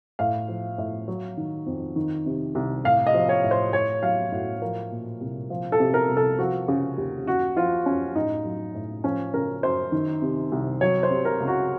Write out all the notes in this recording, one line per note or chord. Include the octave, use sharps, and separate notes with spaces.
A2 F5
F3
A2
F#3
D#3
F2
D#3
C3
C2
A2 F5
D#5
F3
C#5
A2
C5
A2 C#5
F#3 F5
A2 F#4
F3 A#4
A#2
C2
F3
A4
C3
A#4
C2
A4
F3 F#4
C#3
D#2
F#2 F#4
F3 F4
F#2 C#4
A2 D#4
F#3
A2
F3 C#4
C#3 A#4
F#2 C5
D#3
C3
C2
F#3 C#5
C5
C3
A#4
C#2
F#4